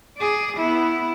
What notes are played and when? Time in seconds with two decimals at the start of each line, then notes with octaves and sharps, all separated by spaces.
0.17 G#4 D5
0.56 B3 E4